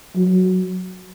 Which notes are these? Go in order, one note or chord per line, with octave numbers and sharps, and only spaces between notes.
F#3